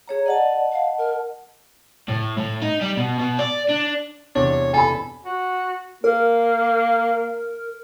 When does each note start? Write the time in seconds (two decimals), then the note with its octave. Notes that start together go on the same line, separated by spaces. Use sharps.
0.08 G#4 C#5 A#5
0.26 D5 D#5 F#5 A5
0.72 F5
0.98 A#4
2.09 A2
2.38 A2
2.62 D#4
2.81 G3
2.97 B2
3.19 B2
3.39 D5
3.69 D4
4.35 E2 C3 D4 C#5
4.73 A4 G#5 B5
5.23 F#4
6.04 A#3 A#4